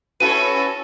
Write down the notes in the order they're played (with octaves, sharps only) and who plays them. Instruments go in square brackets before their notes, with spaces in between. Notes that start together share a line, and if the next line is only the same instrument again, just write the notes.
[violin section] C#4 A4 [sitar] E4 F#4 B4 [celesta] D#7